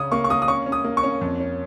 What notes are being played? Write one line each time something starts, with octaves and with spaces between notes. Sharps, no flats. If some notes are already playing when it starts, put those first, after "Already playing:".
Already playing: C#3 C#4 D#6
A#3 C#6
C#6
A#3 D#6
D#6
C#4 C#6
C#4
D#6
A#3
C#6
C#4
F2
C#4